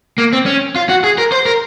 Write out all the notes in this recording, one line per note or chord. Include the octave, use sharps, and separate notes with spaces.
A#3
C4
C#4
F4
F#4
G#4
A#4
C5
A#4